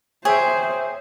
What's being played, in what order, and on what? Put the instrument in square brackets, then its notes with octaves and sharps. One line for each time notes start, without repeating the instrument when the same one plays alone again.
[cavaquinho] G#4 [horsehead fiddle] C5 [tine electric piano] C#5 E5 G5